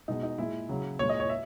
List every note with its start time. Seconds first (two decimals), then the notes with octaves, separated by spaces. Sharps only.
0.08 B2 G#3 D#4
0.23 D#4
0.38 A#2 G#3 E4
0.69 C#3 F#3
0.99 A#2 G#3 C#5
1.09 D#5
1.20 C#5
1.29 E5